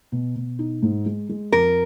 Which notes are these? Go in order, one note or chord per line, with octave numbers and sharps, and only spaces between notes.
B2
B2
D#4
G#2
G#3
G#3
F2 A#4